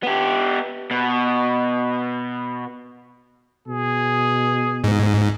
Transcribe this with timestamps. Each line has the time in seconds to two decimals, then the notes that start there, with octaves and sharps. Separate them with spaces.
0.03 B3 G4
0.91 B2
3.68 B2 G#4
4.84 G#2